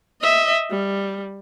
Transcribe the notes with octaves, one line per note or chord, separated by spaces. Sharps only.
D#5 E5
G3